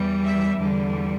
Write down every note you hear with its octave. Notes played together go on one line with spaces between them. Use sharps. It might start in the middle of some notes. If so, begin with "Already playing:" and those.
Already playing: E2 E3 G3
E5
E2 D3 G3